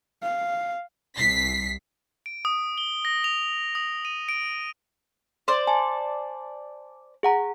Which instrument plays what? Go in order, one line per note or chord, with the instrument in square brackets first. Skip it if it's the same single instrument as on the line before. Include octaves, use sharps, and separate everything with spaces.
[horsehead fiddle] F5
[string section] C2 B6 C7
[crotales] D7
D#6
G7
A#6
F7
D#6
D#7
D7
[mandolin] C5 D5
[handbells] G#5 A5
G#4 F#5 A#5